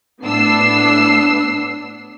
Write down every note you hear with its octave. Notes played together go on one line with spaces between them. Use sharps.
A2 B3 D4 E6 C7